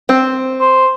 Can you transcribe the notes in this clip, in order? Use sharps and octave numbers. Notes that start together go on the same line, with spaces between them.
C4
C5